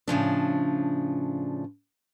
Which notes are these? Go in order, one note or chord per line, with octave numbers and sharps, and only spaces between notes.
A2 C#3 F3 D4